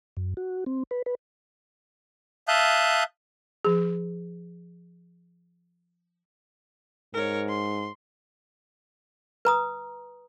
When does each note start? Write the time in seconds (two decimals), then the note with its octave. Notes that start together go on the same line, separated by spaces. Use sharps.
0.17 F#2
0.37 F#4
0.66 C4
0.91 B4
1.06 B4
2.48 E5 F5 A5 D#6 F#6 G6
3.65 F3 G#4
7.14 G#2 A#4 C#5
7.49 C6
9.45 B4 A#5 D#6